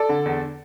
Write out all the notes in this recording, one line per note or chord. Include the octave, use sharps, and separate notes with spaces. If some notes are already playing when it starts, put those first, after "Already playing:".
Already playing: A4 D5
D3
E2